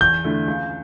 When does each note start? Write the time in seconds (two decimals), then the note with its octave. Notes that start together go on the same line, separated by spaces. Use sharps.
0.01 E2 G6
0.24 D3 A3 E4
0.47 C#2